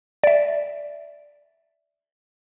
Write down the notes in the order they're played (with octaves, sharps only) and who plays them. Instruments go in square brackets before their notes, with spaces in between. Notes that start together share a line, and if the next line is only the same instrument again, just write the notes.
[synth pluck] D5 E5